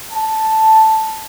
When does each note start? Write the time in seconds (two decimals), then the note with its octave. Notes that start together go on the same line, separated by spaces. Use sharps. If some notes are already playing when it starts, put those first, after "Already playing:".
0.12 A5